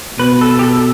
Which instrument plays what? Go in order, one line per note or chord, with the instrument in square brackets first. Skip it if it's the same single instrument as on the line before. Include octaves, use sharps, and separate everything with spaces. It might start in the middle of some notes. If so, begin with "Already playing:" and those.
[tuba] B2 [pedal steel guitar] B4
[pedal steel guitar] A4
G4
A4